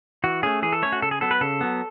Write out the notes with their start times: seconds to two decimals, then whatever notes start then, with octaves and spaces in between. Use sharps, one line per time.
0.24 E3 F#4
0.43 A3 C#4 G#4
0.62 E3 G#4
0.73 A4
0.82 A3 C#4 C#5
0.92 F#4
1.02 C#3 A4
1.11 G#4
1.21 F#3 B3 A4
1.31 B4
1.41 C#3 A4
1.61 F#3 B3